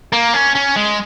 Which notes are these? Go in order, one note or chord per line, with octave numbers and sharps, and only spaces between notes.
A#3
C#4
C#4
G#3